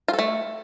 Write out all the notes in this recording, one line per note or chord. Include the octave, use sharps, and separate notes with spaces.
F4
A4
A3